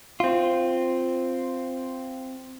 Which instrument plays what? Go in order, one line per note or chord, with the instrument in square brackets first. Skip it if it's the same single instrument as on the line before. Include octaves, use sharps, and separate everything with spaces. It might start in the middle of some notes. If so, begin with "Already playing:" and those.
[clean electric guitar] C4 F4